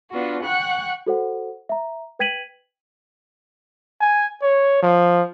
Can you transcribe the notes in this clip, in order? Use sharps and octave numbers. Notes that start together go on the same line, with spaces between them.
B3 D4 F4 F#4
F#5 G5 C#6 F#6
F#4 A4 C5 F#5
E5 A#5
B4 G5 G#6 B6 D#7 F#7
G#5
C#5
F3